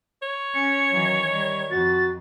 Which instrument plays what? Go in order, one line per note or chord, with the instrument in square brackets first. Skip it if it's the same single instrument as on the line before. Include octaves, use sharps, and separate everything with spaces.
[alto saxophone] C#5
[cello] C#4 [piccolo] C#7
[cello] D#3 E3 [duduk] F#3
[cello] D#3 [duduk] G3
[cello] F2 [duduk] F#4 [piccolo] A6